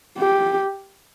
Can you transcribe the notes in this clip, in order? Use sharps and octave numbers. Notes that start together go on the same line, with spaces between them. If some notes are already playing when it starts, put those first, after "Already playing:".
G4